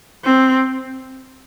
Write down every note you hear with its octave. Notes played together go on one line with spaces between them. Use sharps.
C4